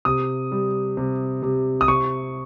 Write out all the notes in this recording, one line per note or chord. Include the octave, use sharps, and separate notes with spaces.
C3 D#6
G3
C3
C3
D#6
C3 C#6